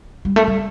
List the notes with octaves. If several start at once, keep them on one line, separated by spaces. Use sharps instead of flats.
G3
A3
G3